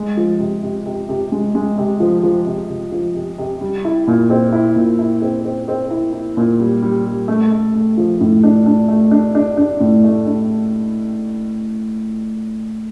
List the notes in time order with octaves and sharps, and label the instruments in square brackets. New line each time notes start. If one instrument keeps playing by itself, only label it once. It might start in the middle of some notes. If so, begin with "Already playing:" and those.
Already playing: [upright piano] G#3
F3
C3
C3
C3
C3
G#3
G#3
C3
F3
F3
C3
C3
F3
C3
C3
G3
E4
A#2
C4
E4
A#2
E4
C4
C4
C4
E4
E4
A#2
G3
G3
G3
A3
A3
A3
F3
A2
D4
D4
A3
D4
D4
D4
A2
A3
D4